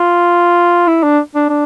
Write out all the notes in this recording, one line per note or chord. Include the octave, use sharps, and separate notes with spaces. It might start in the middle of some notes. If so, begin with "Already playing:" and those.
Already playing: F4
E4
D4
D4
D4